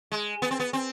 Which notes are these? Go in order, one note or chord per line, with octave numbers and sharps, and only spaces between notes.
G#3
B3
C4
B3
C4